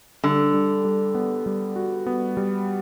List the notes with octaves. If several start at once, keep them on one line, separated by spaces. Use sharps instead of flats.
D3 G3
G3
G3
B3
G3
F#4
B3
G3